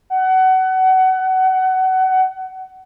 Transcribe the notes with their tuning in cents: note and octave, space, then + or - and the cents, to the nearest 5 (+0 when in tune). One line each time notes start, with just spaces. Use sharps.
F#5 +25